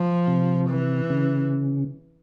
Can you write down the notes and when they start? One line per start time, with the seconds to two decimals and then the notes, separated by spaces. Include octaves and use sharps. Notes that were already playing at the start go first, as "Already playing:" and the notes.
Already playing: F3
0.27 C3
0.69 E3
1.10 C#3